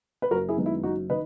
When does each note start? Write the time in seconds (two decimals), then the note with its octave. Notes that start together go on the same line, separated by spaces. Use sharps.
0.22 B4
0.31 F#1 F#4 A#4
0.49 E4 G#4
0.57 F#2 D#3 G#3 B3
0.66 E4
0.83 F#1 D#4 F#4
1.10 D#3 B4 D#5